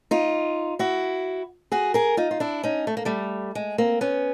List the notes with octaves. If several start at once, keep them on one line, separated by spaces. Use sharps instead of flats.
D#4 F4
E4 F#4
F#4 G#4
G#4 A#4
D#4 F4
F4
D4 E4
C#4 D#4
A3
A#3
G3 A3
G#3
A#3 C4
B3 C#4